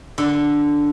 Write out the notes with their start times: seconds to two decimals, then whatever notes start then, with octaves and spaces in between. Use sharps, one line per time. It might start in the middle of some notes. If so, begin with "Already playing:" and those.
0.18 D3